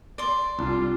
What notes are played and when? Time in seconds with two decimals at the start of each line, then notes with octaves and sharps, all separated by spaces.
0.18 D5 C6
0.59 C2 D4 F4